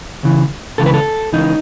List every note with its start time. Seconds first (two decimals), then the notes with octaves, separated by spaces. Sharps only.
0.23 C#2 C#3 E3
0.78 C#2 C#3 E3 A4
0.86 B4
0.94 A4
1.33 C#2 C#3 E3 D#4